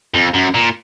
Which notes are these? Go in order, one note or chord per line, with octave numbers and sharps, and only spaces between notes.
F2
F#2
A#2